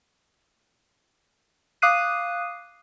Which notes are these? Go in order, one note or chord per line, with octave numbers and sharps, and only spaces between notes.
F5 D6 D#6 F#6 C7 D#7